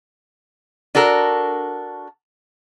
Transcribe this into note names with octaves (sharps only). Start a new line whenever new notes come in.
D4 F#4 A4 A#4